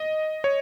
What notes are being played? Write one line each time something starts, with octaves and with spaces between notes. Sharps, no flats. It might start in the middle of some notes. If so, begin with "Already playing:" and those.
Already playing: D#5
C#5